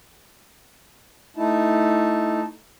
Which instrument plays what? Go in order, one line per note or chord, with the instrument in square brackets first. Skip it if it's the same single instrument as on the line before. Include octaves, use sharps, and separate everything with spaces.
[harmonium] A3 D#4 E4 A5